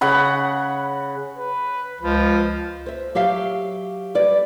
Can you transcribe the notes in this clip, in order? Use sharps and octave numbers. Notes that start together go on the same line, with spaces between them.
C#3 F#5 B5
B4
C#2 F3 B4
C5 E5
F#3 G4 E5 F5
G3 B4 D5